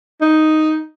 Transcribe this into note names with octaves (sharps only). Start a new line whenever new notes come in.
D#4